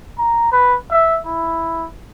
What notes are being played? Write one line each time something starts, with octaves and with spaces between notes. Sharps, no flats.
A#5
B4
E5
E4